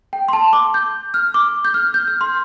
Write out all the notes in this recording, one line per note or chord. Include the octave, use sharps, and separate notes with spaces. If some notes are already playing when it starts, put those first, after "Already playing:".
G5
C6
A5
D6
G6
F6
D6
G6
F6
G6
F6
C6